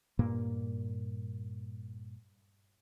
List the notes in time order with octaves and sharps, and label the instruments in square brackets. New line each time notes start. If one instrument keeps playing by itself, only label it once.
[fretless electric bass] G2 A#2 A#3